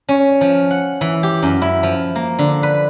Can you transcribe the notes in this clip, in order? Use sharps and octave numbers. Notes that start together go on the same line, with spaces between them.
C#4
F3
F#5
E3
G4
F#2
E4
F3
A#3
D3
B4